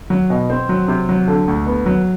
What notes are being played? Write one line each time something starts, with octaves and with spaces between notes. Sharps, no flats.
F#3
B2
C4
F#3
C3
F#3
D3
D2
B3
F#3